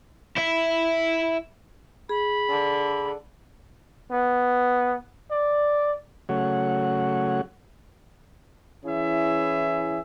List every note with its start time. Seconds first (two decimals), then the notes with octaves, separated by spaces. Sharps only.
0.36 E4 E5
2.09 G#4 B5
2.50 D3
4.12 B3
5.31 D5
6.29 C#3 F#3 A3 F#4 C#5 F#5
8.85 E3 C#4 E4 G#4 E5